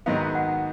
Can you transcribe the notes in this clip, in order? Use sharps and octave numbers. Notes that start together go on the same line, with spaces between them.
G#2 D#3 F#3 B3 D#4 F5
F#5